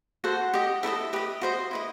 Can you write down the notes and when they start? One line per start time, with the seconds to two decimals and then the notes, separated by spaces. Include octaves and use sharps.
0.24 F#4 A4 C5 F#5
0.54 G4 D#5
0.83 E4 A4 C5 D#5 E5
1.13 G4 B4 D#5
1.42 F#4 C5 D#5
1.71 E4 B4 D#5